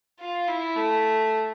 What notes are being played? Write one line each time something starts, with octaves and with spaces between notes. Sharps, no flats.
F4
E4
A3